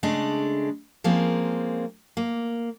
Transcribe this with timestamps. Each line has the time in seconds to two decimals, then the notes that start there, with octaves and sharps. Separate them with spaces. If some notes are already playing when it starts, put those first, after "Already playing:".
0.03 C#3 G#3 A3 D4
1.04 F3 G#3 A#3 C4 C#4 A#4
2.17 A#3